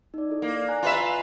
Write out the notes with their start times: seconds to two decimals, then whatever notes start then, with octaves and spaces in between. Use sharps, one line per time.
0.14 D#4 D5
0.30 E4 A4
0.42 A#3
0.55 D5
0.68 G#5 A#5 F#6
0.83 F4 B4 E5